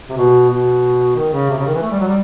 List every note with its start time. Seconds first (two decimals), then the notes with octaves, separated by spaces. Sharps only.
0.09 C3
0.17 B2
0.50 B2
1.16 D#3
1.33 C#3
1.50 C3
1.58 C#3
1.66 D#3
1.74 E3
1.82 A3
1.91 G3
1.99 F#3
2.08 G3